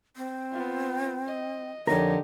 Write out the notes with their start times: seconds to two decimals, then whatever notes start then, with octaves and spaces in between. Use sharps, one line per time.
0.17 C4
0.51 B3 F4
1.27 D#5
1.87 F2 D3 D#4 G4 A#4 C#5